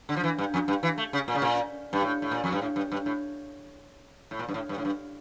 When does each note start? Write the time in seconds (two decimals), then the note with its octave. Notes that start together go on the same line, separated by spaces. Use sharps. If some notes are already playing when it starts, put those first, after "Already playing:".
0.09 D3
0.16 F3
0.24 E3
0.38 G2
0.54 F2
0.68 G2
0.83 E3
0.98 A3
1.13 C#3
1.28 A#2
1.35 C#3
1.42 A#2
1.93 G2
2.02 A2
2.22 A2
2.31 A#2
2.44 F2
2.53 G2
2.62 A2
2.76 G2
2.92 G2
3.06 A2
4.31 A2
4.39 A#2
4.48 G2
4.54 A2
4.69 G2
4.78 A2
4.85 G2